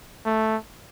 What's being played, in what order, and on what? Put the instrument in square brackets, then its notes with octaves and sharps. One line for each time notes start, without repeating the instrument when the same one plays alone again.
[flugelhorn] A3